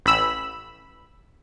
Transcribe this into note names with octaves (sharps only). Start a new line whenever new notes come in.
A1 B5 E6